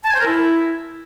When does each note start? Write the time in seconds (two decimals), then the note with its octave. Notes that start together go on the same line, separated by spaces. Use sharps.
0.04 A5
0.09 G#5
0.15 C5
0.20 A#4
0.26 E4